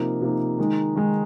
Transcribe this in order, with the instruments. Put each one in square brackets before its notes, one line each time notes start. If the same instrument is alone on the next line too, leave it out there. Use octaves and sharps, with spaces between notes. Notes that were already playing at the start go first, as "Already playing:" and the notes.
Already playing: [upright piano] C3 F3 A#3 D#4
C3 F3 A#3 D#4
D#3 G#3 D#4
D#3 G#3 D#4